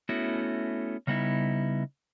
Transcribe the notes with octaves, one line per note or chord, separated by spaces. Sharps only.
A3 B3 C#4 E4 F#4
C#3 G3 B3 D#4 E4